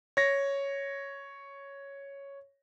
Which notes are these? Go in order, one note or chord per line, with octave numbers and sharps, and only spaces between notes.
C#5 A#6